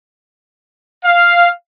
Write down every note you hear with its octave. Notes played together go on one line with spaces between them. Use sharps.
F5